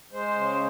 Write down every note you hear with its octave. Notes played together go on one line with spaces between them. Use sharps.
G#3 C5
C#3